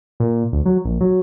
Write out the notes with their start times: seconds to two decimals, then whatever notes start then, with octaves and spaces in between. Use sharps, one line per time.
0.20 A#2
0.53 D2
0.66 F#3
0.85 A#1
1.01 F#3